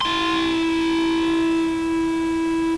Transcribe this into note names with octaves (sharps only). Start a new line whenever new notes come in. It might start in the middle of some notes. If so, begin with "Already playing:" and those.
E4 C6